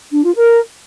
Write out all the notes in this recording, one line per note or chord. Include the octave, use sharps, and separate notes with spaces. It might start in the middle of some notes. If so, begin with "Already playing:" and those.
D4
F4
A#4